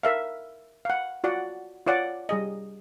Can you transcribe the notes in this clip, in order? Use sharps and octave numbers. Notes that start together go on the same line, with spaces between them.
A#4 E5 F5
F5 F#5
F4 F#4 D5 F#5
F4 C#5 D5 F#5
G3 G#4 D#5